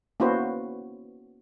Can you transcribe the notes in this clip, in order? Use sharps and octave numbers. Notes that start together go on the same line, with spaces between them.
A#3 B3 C#4 E4 F#4 C5